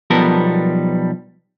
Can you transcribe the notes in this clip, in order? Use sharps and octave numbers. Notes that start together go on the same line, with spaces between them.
B1 F3 G3 B3 A4 A#4